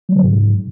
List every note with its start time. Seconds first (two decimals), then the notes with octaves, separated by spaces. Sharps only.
0.09 F#3
0.16 C#3
0.23 G#2